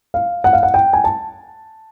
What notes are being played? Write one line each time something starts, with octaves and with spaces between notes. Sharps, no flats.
F5
F#5
F5
F#5
G5
G#5
A5